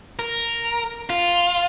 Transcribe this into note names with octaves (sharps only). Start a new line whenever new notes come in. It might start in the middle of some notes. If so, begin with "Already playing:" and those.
A#4
F4